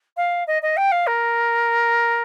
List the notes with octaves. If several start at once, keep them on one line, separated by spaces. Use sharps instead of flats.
F5
D#5
D#5
G5
F5
A#4